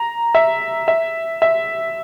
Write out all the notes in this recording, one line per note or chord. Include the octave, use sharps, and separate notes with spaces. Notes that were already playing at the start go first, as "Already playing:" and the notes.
Already playing: A#5
E5
E5
E5